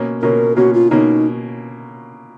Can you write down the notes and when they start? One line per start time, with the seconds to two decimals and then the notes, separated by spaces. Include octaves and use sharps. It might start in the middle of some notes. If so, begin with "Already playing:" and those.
Already playing: B2 A#3 C#4
0.22 B2 A#3 C#4 A#4
0.56 B2 A#3 C#4 F#4
0.74 F4
0.91 B2 A#3 C#4 D#4